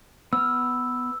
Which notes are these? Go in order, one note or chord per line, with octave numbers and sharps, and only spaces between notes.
B3 E6 F6